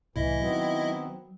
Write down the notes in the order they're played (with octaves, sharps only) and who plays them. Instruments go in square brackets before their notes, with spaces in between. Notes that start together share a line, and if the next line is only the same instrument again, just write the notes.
[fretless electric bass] C2 A2 [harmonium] E3 [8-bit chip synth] E4 D#5 E5
[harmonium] D#3 B3 C4 [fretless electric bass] F#3